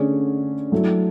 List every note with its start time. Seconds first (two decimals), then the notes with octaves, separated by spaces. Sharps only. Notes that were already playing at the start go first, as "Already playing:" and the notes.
Already playing: D3 A3 C#4 G#4 D5
0.71 F#3 A3 E4